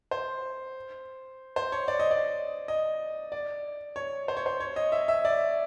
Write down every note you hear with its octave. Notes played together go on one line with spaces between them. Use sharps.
C5
C5
C#5
D5
D#5
D5
D#5
D5
C#5
C5
C#5
C5
C#5
D#5
E5
E5
D5